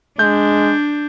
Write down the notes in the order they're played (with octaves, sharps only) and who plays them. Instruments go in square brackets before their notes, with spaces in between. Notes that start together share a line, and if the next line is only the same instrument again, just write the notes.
[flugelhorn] G#3 [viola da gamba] D4 [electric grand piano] G6